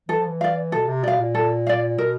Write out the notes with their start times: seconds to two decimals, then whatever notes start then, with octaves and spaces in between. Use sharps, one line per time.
0.09 E3 A4
0.18 F3
0.28 E3
0.41 D5 F5
0.72 B2 A4
0.88 C3
1.04 B2 D5 F5
1.20 A#2
1.35 A4
1.67 D5 F5
1.98 B2 A#4